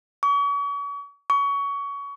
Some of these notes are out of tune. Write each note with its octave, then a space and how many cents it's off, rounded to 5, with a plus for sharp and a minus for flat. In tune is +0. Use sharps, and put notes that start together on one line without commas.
C#6 +40
C#6 +25